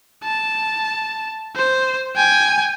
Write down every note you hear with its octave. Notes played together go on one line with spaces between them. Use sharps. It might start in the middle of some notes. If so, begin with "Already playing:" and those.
A5
C5
G5 G#5